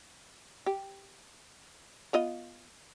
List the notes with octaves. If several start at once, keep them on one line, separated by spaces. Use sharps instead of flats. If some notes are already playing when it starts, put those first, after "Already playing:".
G4
B3 F4 D#5